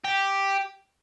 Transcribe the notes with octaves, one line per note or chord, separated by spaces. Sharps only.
G4